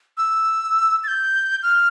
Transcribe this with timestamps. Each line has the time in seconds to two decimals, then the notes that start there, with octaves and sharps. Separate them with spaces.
0.18 E6
1.04 A6
1.08 G6
1.63 F6